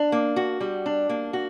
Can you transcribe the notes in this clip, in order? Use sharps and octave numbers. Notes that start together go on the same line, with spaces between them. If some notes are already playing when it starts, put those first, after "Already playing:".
Already playing: D4
A#3
F#4
G3
D4
A#3
F#4